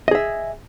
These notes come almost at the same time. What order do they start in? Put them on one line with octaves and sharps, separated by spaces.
D#5 G#4 E5